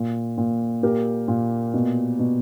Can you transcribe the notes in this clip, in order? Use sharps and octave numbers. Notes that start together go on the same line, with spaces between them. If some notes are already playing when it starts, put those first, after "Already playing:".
Already playing: A#2
A#2
A#2 G4 A#4
A#2
B2
B2